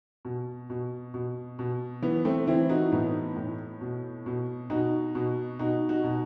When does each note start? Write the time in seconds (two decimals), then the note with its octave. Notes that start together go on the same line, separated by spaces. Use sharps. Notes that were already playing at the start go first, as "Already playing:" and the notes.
0.25 B2
0.70 B2
1.14 B2
1.59 B2
2.02 E3 B3
2.25 A3 C4
2.47 E3 C4 E4
2.69 D#4 F#4
2.92 A2 B3 D#4
3.36 A2
3.81 B2
4.26 B2
4.70 B2 D#4 F#4
5.15 B2
5.59 B2 D#4 F#4
5.89 D#4 F#4
6.04 B2